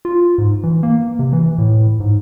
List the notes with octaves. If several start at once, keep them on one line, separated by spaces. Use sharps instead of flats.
F4
G#2
E3
A#3
C3
E3
A2
G#2